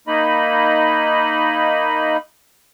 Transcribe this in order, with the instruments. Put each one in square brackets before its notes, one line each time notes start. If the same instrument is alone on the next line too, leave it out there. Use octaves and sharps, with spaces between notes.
[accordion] A#3 D#4 D#5 B5